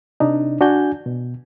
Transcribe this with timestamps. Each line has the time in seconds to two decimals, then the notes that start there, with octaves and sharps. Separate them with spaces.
0.20 C3 D4 D#4
0.61 D4 F#4 G#5 G6
1.06 B2